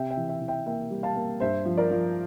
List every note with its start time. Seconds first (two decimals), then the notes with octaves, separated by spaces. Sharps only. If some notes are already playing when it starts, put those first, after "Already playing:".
Already playing: C3 E5 G5
0.11 E5 G5
0.17 E3
0.29 E5 G5
0.42 E3
0.48 E5 G5
0.66 A#3 E5 G5
0.91 G3
1.03 F5 A5
1.16 A#3
1.40 G2 C5 E5
1.65 F3
1.77 A#4 D5
1.91 F3